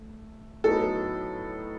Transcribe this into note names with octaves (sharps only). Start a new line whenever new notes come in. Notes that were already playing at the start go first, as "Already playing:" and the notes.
Already playing: A3
A2 F#3 B3 D#4 A4